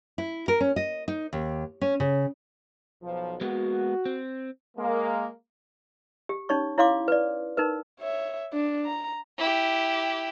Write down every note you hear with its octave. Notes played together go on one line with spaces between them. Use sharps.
E4
A#4
C#4
D#5
D#4
D#2
C#4
C#3
B1 F3
G#3 A#3 B3 F#4
C4
G#3 A#3
G4
C#4 D#4 C#5 C#6
E4 C#5 F5 C6 D6
B4 D5
D#4 A#4 B4
C#5 E5
D4
A#5
E4 G4